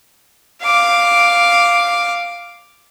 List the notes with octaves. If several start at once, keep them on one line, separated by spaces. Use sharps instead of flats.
F5 D6